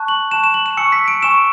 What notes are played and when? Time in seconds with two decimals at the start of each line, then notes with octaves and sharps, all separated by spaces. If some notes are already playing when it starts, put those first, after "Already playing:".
Already playing: A5 C#6 F#6
0.08 F#7
0.31 A5 C#6 F#6 E7
0.44 E7
0.54 F#7
0.66 E7
0.77 G#5 C#6 E6 C#7
0.92 B6
1.08 D7
1.23 G#5 C#6 E6 E7